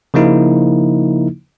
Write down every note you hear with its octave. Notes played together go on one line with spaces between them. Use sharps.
C#3 F3 A#3 D#4 E4